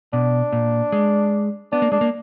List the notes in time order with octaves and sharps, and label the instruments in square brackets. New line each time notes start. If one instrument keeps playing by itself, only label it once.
[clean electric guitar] B2 [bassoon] D4
[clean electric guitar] A#2
G#3
[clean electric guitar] B3 [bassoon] D4
[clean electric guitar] A#3
[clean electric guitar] G#3 [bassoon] D4
[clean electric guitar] A#3